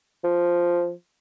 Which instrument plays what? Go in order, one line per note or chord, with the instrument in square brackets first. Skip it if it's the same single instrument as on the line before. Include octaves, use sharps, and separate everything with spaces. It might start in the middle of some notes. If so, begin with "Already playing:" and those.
[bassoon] F3